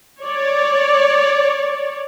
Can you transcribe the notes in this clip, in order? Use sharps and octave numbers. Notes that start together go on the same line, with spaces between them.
C#5 D5